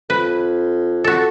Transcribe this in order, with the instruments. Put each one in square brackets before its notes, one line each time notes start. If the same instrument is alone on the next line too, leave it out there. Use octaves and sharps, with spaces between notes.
[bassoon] F2 [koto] B4
[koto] F#4 A4